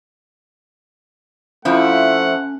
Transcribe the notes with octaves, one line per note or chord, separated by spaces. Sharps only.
F2 F3 A3 C#4 E4 F#5